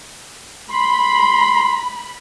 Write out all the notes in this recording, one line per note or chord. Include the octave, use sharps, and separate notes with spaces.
B5 C6